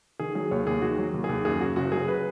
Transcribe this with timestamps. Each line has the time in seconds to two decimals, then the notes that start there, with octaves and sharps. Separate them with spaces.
0.19 D#3 G#4
0.35 F#3 G#4
0.51 D#2 C#5
0.67 D#2 G#4
0.82 D#3 F#4
0.98 F#3
1.14 D#2
1.24 D#2 G#4
1.45 F#2 G#4
1.61 C#3 F#4
1.76 F#1 F#4
1.92 F#3 G#4
2.08 B4